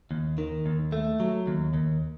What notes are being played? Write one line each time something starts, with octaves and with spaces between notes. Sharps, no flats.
D#2
D#3
D#2
A3
F#3
D#2
D#2